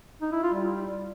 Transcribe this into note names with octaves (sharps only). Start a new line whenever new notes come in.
D#4
E4
F4
G3